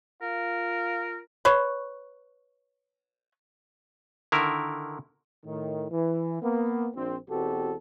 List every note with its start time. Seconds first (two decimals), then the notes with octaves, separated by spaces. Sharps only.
0.22 F4 A#4 F5
1.45 B4 C#5
4.32 D3 D#3 E4 A#4
5.46 A2 D#3
5.91 E3
6.42 A#3 B3
6.96 A#1 C4
7.30 E2 B2 C4 F#4 G4 A4